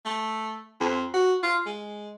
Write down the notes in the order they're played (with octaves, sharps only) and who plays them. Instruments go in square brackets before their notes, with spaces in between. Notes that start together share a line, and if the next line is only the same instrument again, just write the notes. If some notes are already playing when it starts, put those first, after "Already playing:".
[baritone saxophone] A3
F2
F#4
F4
G#3